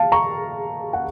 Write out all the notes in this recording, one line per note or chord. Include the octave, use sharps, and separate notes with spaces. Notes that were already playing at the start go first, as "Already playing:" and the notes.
Already playing: F5 A5
A#5 C#6
F#5